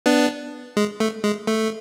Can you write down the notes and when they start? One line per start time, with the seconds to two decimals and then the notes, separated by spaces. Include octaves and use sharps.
0.06 B3 D4
0.77 G#3
1.00 A3
1.24 G#3
1.47 A3